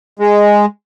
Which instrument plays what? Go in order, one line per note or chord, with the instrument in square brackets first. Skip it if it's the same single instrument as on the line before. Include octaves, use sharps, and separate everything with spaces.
[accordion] G#3